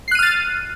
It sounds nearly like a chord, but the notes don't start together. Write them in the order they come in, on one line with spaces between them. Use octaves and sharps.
C7 F#6 D#7 F6 A6